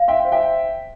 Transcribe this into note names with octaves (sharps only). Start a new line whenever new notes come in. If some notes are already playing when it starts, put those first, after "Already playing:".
Already playing: F5
E5 G5 C6
C5
E5 G5